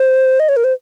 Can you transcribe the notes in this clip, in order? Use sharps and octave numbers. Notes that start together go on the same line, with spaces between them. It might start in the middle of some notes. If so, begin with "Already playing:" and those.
Already playing: C5
D#5
C#5
A#4
C5